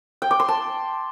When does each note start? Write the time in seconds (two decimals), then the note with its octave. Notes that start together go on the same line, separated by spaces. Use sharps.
0.22 G5
0.31 D6
0.40 C6
0.48 A5